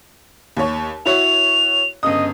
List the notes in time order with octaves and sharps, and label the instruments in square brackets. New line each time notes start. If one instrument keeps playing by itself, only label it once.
[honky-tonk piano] D#2 C#5
[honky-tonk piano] E4 F#4 C#5 [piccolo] F7
[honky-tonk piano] G1 C#3 D#6 [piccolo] D#5